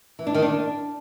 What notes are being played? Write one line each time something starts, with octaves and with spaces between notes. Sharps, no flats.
E3
D4
D#3
D4